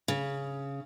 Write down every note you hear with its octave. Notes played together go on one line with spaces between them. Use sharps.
C#3